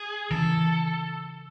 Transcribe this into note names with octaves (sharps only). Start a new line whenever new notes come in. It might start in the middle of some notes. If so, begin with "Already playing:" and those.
Already playing: G#4
C#3 E3 A4